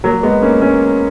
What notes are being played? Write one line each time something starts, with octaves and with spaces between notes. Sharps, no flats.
F#3 A#3
G#3 B3
A#3 C#4
A#3 C#4